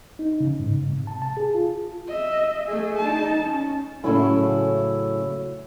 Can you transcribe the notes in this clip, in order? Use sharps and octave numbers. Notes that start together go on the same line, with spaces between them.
D#4
C#3
G#2
C3
A5
A5
G#4
F4
D#5 E5
A3 G#4
D#4 A5
C#4
A2 C#3 F#3 A3 C#4 E4